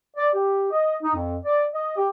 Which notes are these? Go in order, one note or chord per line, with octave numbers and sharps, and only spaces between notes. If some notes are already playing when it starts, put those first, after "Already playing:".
D5
G4
D#5
D#4
F2
D5
D#5
G4